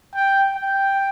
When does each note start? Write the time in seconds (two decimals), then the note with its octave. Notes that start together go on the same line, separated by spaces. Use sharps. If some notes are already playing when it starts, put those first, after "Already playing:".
0.15 G5
0.55 G5